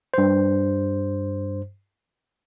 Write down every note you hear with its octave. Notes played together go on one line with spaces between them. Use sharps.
G2 C5